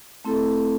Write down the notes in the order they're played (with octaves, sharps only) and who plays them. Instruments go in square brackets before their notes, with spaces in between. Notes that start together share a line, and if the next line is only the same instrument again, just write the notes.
[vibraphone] A3 C4 E4 A4